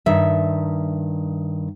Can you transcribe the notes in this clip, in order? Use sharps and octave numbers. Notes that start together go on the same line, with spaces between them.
G2 D#3 E5